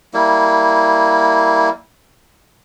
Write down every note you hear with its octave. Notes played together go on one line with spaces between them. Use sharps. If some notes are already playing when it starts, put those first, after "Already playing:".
G3 A#3 E4